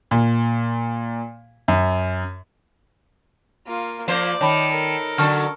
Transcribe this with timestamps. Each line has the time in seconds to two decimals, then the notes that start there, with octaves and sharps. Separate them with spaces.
0.11 A#2
1.68 F#2
3.66 A#3 F4
4.08 F3 A#3 C5 D5
4.41 D#3 C#5 A5 B5
4.70 A4 A#4
5.18 D3 F#3 A5 C#6 F6